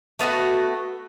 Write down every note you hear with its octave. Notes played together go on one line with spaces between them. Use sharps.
A3 B3 F4 F#4